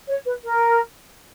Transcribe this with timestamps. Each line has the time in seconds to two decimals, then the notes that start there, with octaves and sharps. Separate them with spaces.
0.08 C#5
0.26 B4
0.44 A#4